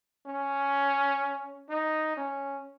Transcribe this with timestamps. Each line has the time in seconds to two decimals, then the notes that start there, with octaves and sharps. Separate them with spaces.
0.26 C#4
1.69 D#4
2.17 C#4